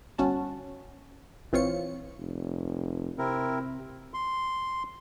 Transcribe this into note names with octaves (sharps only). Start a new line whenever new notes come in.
G1 C#4 F#4 A5
A#1 E3 C4 F4 C#5 C#7
F1
C3 C4 E4 A#4
C6